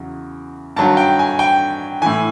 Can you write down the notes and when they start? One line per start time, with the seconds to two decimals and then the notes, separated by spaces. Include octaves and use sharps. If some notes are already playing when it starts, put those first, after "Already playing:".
Already playing: E2 C#3 F#3
0.76 G2 D#3 F#3 A5
0.97 G5
1.19 G#5
1.39 G5
2.02 A2 E3 G#5